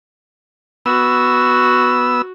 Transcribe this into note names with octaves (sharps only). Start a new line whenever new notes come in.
B3 F#4 E6